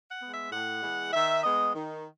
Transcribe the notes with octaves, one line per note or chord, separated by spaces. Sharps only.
F#5
G#3 B3
E5
A2 F#5
E3 G#3 B3
D#3 E5
G#3 B3 D#5
D#3